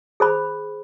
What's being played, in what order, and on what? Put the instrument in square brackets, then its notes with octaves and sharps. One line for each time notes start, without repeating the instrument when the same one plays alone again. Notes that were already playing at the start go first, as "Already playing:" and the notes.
[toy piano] G#4 C5 B5